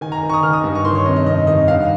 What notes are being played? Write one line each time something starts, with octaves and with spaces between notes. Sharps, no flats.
D#3 G#5
A#5
D#3
C#6
D#6
D#3 F6
D#6
G2
C#6
D#3 C6
C#5
C3 D#5
D#5
F2 D#5
D#3 D#5
G2 F5